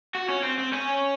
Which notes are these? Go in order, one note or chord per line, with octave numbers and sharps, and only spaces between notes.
F#4
C#4
C4
C4
C#4